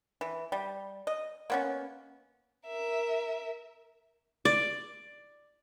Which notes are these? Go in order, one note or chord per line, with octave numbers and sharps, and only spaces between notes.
E3
G3
D#5
A#3 B3 C#4
A#4 E5
D5